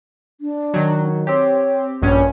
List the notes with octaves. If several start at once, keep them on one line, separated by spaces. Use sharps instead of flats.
D4
D#3 F#3
C4 G4 C#5
A#1 G2 C#4 C#5